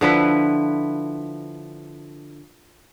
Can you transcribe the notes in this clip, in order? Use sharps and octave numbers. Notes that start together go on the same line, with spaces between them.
D3 F3 E4 B4